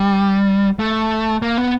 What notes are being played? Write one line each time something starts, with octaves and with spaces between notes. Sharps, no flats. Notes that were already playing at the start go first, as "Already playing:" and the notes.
Already playing: G3
A3
A#3
B3